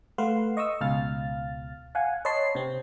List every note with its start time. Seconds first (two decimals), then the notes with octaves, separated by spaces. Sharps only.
0.18 A3 B4 F5 F#5 C6
0.57 D#5 C#6 D#6 E6
0.81 C#2 B2 F5 F6 A6
1.95 F5 F#5 G#5
2.25 C#5 D#5 A5 B5 C6 C7
2.55 C3 C4